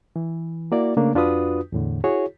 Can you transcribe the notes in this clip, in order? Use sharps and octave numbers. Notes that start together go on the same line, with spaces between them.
E3
A#3 E4 F#4 D5
C#3 A3 A#3 D4
F2 D4 F4 F#4 B4 D#6
E2 A2 D3
E4 F#4 G#4 C#5